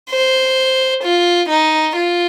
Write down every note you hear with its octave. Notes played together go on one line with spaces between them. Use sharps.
C5
F4
D#4
F4